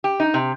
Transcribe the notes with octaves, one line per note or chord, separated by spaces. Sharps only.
G4
D#4
C3